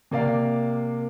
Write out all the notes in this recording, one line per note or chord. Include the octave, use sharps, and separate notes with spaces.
C3 A#3 D5 F5